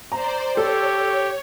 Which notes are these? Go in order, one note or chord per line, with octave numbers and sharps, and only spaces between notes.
C5 D5 A#5
G4 A4 C#5